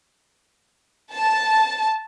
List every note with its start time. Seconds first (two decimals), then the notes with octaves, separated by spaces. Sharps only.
1.14 A5